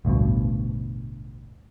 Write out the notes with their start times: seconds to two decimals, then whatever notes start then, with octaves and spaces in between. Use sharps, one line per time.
0.05 A1 D2 G2 B2